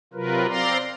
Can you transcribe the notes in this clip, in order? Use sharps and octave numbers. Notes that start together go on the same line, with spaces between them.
C3 F#3 F4 A#4 B4
C4 D5 F5 A#5 C6